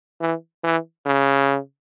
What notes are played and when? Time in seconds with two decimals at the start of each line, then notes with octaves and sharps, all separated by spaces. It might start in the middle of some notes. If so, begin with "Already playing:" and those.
0.21 E3
0.64 E3
1.06 C#3